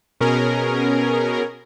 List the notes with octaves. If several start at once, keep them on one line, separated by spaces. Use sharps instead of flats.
B2 C#4 G#4 A#4